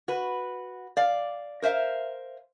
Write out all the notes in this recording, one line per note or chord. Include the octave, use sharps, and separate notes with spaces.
F#4 B4
D5 F5
A#4 C5 E5 F5